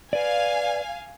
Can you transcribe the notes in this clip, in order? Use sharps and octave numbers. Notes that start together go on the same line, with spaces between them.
B4 D5 F5 G#5